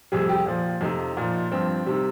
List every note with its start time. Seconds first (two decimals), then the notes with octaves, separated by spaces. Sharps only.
0.12 F2 C3 G3 G#4
0.29 G4
0.46 A#2 F3
0.81 F2 C3 F3 D#4
1.17 A#2 F3
1.51 G2 F3 C4
1.86 C3 D#3 G3